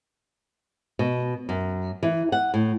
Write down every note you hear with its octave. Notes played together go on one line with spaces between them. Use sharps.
B2
F#2
E3
F#5
A2